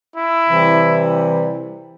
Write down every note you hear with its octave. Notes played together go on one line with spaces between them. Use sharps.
E4
C3 E3 G3